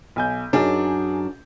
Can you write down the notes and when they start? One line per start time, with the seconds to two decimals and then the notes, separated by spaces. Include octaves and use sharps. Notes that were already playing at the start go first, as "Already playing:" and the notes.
0.16 B1 G#5 G6
0.53 F#2 D4 D#4 G#4